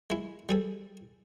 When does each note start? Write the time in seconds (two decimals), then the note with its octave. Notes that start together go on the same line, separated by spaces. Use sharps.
0.10 G#3 E4
0.49 G3 G#4 A4